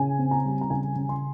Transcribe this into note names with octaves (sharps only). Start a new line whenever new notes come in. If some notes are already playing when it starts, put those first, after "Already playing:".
Already playing: C#3 G#5
C4
A#5
G3
A#5
C#3 G#5
C#3
C6